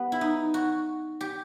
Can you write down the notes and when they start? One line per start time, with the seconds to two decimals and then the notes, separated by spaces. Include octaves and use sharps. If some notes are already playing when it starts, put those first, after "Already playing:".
Already playing: G3 B3
0.12 E4
0.21 D#4
0.54 F#4
1.21 G4